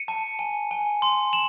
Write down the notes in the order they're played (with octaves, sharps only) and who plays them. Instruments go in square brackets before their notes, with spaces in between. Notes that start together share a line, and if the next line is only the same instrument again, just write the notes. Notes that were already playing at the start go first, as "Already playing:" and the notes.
Already playing: [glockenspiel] C#7 D#7
A5
G#5
G#5
C6
E7 F#7